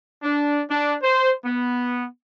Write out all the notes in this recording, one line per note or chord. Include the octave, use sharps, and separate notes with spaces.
D4
D4
C5
B3